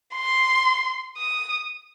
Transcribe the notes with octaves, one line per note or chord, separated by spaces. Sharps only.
C6
D#6